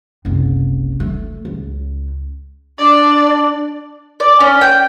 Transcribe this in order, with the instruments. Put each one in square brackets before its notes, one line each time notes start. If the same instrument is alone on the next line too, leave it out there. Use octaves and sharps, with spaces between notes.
[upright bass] F#1 C2
A3
C#2
[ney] D4 [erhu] D5
[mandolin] D5
C#4
G5